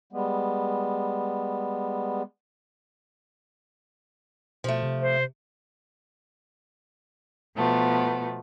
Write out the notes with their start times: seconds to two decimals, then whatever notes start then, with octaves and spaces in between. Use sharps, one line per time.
0.13 G3 G#3 B3
4.64 B2 F3 A3
4.83 C3
5.01 C5
7.55 B2 F3 A3 B3